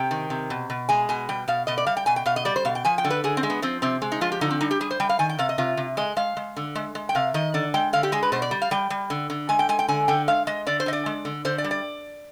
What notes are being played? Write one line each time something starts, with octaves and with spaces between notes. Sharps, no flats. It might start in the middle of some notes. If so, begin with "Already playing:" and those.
Already playing: C3 G5
D#3
C3
B2
B2
G#3 G#5
B2 G#5
G3 G5
B2 F5
B2 D#5
D5
G3 F5
G5
B2 G#5
G5
B2 F5
D#5
G3 D5
C5
B2 F5
G5
F3 G#5
G5
D3
B4
D3 G#4
C4
G#3
B3
F3 C4
C3 C4
G#3
D#4
F3 F4
G4
D3 D#4
C4
G3 D#4
G4
G3 G#4
C5
G3 G5
F5
D#3 G#5
G5
C3 F5
D#5
C3 F4
C3
G#3 D#5
G#3 F5
G#3
D3
G#3
G#3
G5
C3 F5
D#3 D#5
D3 D5
G#3 G5
D3 F5
G4
G#3 G#4
B4
B2 C5
D5
G3
F5
G3 G5
G3
D3
D3
G#3 G#5
G5
G#3 G#5
G5
D3 G#5
D3 G5
G#3 F5
G#3 D#5
D3 D5
C5
D3 D#5
D5
G#3
D3
D3 C5
D5
G3
D5